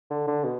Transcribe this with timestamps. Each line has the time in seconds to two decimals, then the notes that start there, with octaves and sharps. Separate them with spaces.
0.10 D3
0.27 D3
0.44 B2